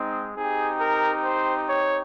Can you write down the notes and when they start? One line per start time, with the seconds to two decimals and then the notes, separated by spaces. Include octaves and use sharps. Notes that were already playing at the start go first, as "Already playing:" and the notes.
Already playing: G#3 C4 D#4
0.36 C4 D#4 G4 G#4
0.81 A#4
1.25 C5
1.69 C#5